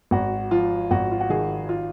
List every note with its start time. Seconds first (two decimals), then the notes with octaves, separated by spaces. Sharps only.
0.11 G#1 F#4
0.51 F3 F4
0.91 G#1 F#4
1.12 F4
1.20 F#4
1.30 D#3 G#4
1.69 F4